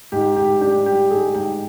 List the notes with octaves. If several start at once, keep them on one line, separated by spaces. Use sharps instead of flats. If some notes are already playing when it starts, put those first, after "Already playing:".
G#2 G4
G#2 G4
D4 G4
G3 G4
G#2 G#4
G#2 G5